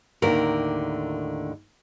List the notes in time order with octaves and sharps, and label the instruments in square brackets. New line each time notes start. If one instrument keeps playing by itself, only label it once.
[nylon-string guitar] D#2 A2 D3 A#4